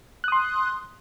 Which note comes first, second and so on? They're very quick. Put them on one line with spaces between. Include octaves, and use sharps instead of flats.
F#6 D#6 C6